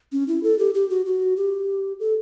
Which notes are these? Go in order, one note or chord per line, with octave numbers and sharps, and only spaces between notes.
C#4
E4
A4
G4
G4
F#4
F#4
G4
A4